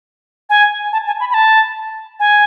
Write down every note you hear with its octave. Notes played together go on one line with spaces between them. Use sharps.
G#5
A5
G#5
B5
B5
A5
G#5